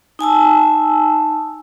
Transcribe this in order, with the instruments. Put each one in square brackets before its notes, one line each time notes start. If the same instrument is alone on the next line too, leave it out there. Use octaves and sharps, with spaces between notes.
[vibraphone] D#4 G#5 A5 E6